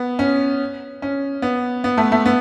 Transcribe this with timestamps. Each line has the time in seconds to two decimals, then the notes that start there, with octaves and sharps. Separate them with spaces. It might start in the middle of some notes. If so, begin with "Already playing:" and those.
Already playing: B3
0.19 C#4
1.02 C#4
1.42 B3
1.84 B3
1.98 A3
2.12 A3
2.26 B3